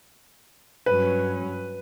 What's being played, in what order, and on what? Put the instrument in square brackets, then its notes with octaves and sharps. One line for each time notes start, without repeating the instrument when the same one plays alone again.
[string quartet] G2 F#3 C#4 [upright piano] B4